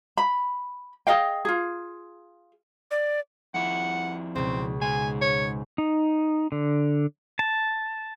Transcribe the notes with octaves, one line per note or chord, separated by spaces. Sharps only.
B5
G#4 D#5 F5 G5
F4 G#4
D5
F2 E4 F#5
C#2 B2 C4
G#2 G#3 G#5
C#5
D#4
D3
A5